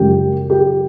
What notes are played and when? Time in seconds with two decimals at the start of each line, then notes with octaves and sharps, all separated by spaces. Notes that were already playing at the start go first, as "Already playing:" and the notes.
Already playing: F#2 C#3 F3 G#3 G4
0.50 G4